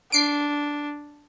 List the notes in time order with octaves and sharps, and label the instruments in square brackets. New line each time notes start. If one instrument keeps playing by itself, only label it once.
[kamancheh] D4 [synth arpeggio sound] C7 D7